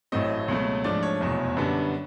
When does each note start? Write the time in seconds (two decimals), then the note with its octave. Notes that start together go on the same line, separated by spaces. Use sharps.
0.12 A1 A2 F#3 A3 C4 D#5
0.48 C#2 B2 F#3 A3
0.84 G#2 F3 A3 D4 D5
1.03 C#5
1.20 F1 E2 B2 F#3
1.57 F#2 D3 G3 B3 D4